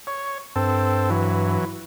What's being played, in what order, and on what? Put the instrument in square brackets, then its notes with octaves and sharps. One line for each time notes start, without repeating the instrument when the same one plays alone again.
[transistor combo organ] C#5
[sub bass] G2 [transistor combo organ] C4 A4
[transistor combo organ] E3 F#3